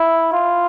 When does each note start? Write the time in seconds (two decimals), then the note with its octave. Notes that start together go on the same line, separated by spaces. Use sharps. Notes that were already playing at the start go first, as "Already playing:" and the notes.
Already playing: E4
0.33 F4